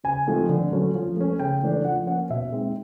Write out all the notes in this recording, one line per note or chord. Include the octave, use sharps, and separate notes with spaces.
C#3 G#5
F3 A3 C4 D#4
D3
F#3 A3 C#4
F3
A3 C#4
C#3 G5
E3 A3 D4
F3 F#5
A#3 C#4 F#5
B2 E5
G#3 C4 D#4